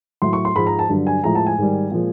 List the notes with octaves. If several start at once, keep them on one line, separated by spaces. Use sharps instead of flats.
A2 F#3 C6
C#6
C6
G#2 F3 G#3 B5
A#5
A5
G2 D3 F#3
G#5
A2 F3 G#3 A#5
A5
G#5
G#2 D#3 G3
A#2 F3 G#3